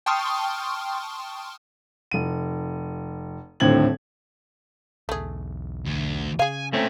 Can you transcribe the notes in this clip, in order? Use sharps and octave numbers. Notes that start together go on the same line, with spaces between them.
G5 A5 C6 C#6 D#6 F6
F1 D#7
D#1 A2 D3 C4 G#6 F#7
B1 E2 A3 G#4
D2
C#3 G#4 F5 G#5
A#2 A3 C4 C#4